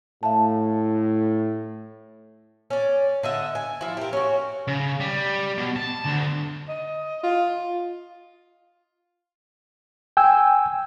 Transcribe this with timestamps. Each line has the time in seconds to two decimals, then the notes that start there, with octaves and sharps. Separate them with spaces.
0.23 A2 E5 F5 A5
2.70 C#4 D5
3.23 D3 D#5 E5
3.55 G#5
3.81 F3 E4
3.97 G4 A#4
4.13 C#4 F#4
4.68 C#3
5.00 G3
5.57 B2
5.76 A5
6.06 D2
6.69 D#5
7.23 F4
10.17 G5 G#5 E6